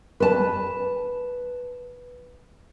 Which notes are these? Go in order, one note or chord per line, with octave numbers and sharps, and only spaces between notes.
B4 A5